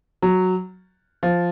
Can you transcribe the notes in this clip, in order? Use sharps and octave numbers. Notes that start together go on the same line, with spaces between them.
F#3
F3